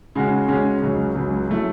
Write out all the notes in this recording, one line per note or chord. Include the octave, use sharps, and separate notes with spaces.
C#3 G#3 C#4 F#4
C#3 G#3 C#4 F#4
C#2 C#3 F#3
C#2 C#3 F#3
F#3 A3 E4